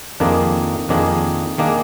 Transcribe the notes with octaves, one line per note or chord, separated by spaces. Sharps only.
F2 D#3 A#3 D4 G#4
F2 D#3 A#3 D4 G#4
D#3 A#3 D4 G#4